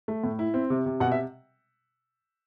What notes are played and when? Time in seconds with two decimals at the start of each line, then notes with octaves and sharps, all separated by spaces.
0.08 A3
0.24 A2
0.39 E4
0.54 C4
0.70 C3
0.86 C3
1.00 B2 F#5
1.12 E5